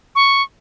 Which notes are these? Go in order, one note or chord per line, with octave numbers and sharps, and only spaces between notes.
C#6